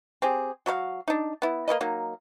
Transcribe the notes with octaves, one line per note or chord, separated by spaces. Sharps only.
C4 G4 G#4
F#3 F#4 B4 F5
D4 D#4
B3 E4
A#3 E4 B4 D#5
F#3 A#3 D#4